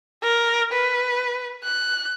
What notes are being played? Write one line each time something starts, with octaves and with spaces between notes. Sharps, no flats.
A#4
B4
F#6